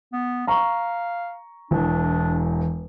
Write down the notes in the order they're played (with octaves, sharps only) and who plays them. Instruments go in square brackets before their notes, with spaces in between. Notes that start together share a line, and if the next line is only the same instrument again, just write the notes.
[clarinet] B3
[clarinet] F5 [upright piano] A#5 C#6
[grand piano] E1 E2 [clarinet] D4